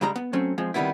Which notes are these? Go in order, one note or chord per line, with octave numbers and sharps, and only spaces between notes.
C#2 G2 G3 G#3 A#5
B3
F#3 A3 C4 C#4
F3 G#3 C4
C3 D#3 G3 A3 B3 E4